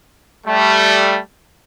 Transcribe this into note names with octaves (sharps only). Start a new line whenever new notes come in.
G3 A3